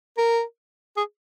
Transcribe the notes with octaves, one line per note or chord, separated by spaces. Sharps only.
A#4
G#4